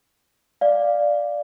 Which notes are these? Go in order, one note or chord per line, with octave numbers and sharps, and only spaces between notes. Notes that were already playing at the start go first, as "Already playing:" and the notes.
D5 F5